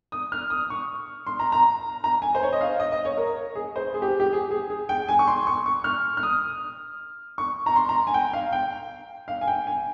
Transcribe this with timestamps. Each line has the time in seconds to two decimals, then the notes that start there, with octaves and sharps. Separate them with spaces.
0.12 D#6
0.32 F6
0.50 D#6
0.70 C#6
1.27 C6
1.39 A#5
1.52 A#5
2.04 A#5
2.22 G#5
2.35 C5
2.43 C#5
2.53 D#5
2.61 F5
2.80 D#5
2.92 D#5
3.05 C#5
3.17 A#4
3.55 G#4
3.76 C5
3.94 G#4
4.02 G4
4.20 G4
4.33 G#4
4.51 G#4
4.70 G#4
4.89 G5
5.09 G#5
5.19 C#6
5.27 C6
5.47 C#6
5.66 C#6
5.84 F6
6.17 F6
6.23 D#6
7.38 C#6
7.66 A#5
7.76 C6
7.89 A#5
8.07 G#5
8.14 G5
8.33 F5
8.53 G5
9.28 F5
9.41 G#5
9.48 G5
9.67 G#5